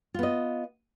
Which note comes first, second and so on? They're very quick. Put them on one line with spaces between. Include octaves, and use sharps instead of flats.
F4 B3 D#5